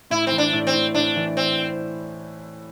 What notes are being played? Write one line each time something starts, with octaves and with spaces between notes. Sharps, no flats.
A2 E4
E3 C4
D4
A2
C4
A2
A2 D4
E3
C4